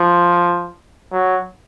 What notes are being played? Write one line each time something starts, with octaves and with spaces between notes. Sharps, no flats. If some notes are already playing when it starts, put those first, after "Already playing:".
Already playing: F3
F#3